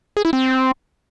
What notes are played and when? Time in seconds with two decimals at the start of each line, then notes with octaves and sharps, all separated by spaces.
0.17 G#4
0.25 E4
0.33 C4